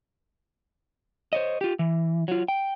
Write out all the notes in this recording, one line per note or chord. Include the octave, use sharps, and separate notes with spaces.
C5 C#5 D#5
F4 G4
E3
F#3 F4
G5